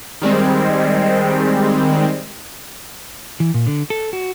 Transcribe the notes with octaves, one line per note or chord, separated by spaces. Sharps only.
D#3 G3 G#3 C4
E3
A#2
D3
A4
F#4